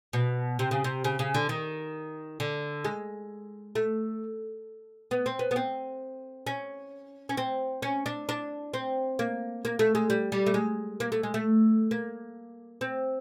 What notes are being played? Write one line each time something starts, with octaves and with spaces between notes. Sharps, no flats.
B2
C3
C#3
C3
C#3
C#3
D3
D#3
D3
G#3
A3
B3
C4
B3
B3
C4
C#4
C#4
C4
C#4
D4
D4
C4
A#3
A#3
A3
G#3
G3
G3
A3
G#3
A#3
A3
G#3
A3
A#3
C4